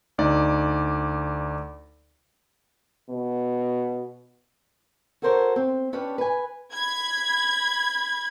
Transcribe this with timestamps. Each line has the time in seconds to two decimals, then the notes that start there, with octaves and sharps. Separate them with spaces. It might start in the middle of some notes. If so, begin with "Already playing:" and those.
0.18 D2 D#4 D5
3.09 B2
5.22 F#4 A4 A#4 C5 C#5
5.56 C4
5.93 C#4 D4 G4 B4 C#5
6.18 B4 G#5
6.73 B5 G#6